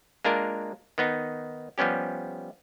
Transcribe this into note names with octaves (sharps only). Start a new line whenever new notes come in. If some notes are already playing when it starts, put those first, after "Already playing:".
G#3 A#3 D4 F4 A#4
D#3 B3 D#4
F3 G3 B3 C#4 G4